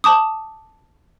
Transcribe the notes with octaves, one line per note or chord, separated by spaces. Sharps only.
A5 D6 D#6